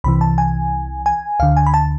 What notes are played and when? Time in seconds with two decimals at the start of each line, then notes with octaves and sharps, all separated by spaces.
0.04 C2 C3 E3 B5
0.21 A5
0.38 G#5
1.06 G#5
1.40 D2 D3 F5
1.57 G#5
1.66 B5
1.74 A5